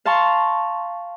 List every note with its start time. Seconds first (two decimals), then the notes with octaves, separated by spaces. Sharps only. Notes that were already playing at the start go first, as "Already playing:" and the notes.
0.05 F5 A5 A#5 C6 C#6